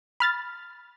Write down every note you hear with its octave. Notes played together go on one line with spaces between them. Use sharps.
B5 F6 A6